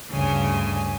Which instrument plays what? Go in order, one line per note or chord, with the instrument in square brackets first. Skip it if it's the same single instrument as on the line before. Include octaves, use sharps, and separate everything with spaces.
[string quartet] D2 G2 G#5 [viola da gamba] C#3